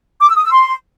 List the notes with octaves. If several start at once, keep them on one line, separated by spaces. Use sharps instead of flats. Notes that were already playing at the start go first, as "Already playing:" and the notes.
D6
E6
D#6
E6
C6